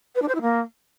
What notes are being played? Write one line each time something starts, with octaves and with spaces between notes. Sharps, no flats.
B4
D4
C5
E4
A#3